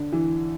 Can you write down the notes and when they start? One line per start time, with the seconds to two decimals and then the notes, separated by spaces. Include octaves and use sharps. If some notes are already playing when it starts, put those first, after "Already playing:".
Already playing: D3
0.13 E3